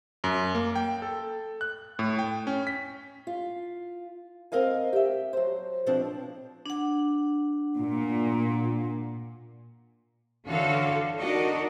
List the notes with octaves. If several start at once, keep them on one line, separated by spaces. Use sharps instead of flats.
F#2
A#3
G5
A4
F#6
A2
G5
C#4
B6
F4
C4 A#4 D#5 F5 G#5
G4 E5
F#3 C5
B2 F3 C4 D4 F4
D4 F#5
A#2
D3 E3 F#4 A4 C#5 F5
D4 D#4 F#4 A#4 D5 D#5